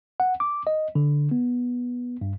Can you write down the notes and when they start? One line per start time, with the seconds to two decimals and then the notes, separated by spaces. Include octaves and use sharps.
0.20 F#5
0.40 D6
0.67 D#5
0.95 D3
1.31 B3
2.21 G2